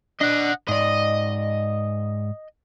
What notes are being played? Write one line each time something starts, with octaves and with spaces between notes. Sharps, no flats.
D4 D#5 F#5
G#2 D5 D#5